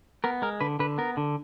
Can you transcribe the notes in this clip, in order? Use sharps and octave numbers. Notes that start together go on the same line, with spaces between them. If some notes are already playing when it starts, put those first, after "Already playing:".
B3 A#4
G#3 A#4
D3 B4
D3 B4
B3 A#4
D3